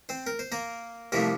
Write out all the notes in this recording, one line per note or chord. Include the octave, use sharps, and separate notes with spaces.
C4 C5
A#4
C5
A#3 A#4
C2 C3 F3 A3 A#3 A#4